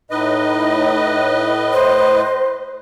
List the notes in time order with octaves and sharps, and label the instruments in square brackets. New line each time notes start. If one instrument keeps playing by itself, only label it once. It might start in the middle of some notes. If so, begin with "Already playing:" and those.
[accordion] A2 B4 D#5 [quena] D#4
[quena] C5